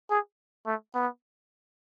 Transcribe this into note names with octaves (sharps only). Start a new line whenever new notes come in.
G#4
A3
B3